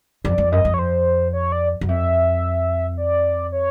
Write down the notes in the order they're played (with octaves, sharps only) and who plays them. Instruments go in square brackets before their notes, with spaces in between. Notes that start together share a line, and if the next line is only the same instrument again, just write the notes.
[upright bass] F2 [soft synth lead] D5
[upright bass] F2
[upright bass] F#2 [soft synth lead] D#5
[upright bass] F2
[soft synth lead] C#5
C5
C#5
D5
[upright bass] F#2
[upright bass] F2 [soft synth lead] E5
[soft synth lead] D5
C#5